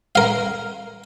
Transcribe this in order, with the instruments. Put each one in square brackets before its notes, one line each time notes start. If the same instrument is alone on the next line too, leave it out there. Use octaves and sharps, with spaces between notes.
[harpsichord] A#4 F5